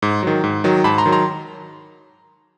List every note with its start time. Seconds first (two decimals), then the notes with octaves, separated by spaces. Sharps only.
0.02 G#2
0.23 D#3 F#3
0.44 G#2
0.64 D#3 F#3
0.84 G#2 A5 B5
0.98 A#5 C6
1.06 D#3 F#3
1.12 A#5 C6